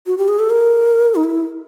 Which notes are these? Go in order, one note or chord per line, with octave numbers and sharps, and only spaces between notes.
F#4
G4
G#4
A4
A#4
D#4
E4